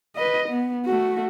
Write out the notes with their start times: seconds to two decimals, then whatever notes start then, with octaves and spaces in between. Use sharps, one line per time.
0.16 B4 D#5
0.49 B3
0.86 A3 F#4